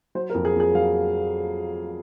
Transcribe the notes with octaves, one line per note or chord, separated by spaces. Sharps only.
F#3 C5
A#4
F2
G#4
F2
G#4
F#3 F5